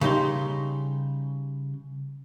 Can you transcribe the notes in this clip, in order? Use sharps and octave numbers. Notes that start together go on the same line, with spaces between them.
C#3 G3 D#4 C6